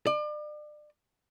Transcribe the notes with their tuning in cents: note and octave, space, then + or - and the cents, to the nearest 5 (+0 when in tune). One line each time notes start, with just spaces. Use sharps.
D5 +35